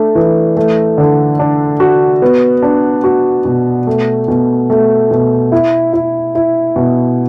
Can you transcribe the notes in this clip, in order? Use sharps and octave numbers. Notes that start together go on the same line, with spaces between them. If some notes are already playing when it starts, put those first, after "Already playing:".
Already playing: A3 D4
E3
A3
D3
D4
F#4
B3
D4
F#4
B2
A3
B2
A3
B2
E4
E4
E4
B2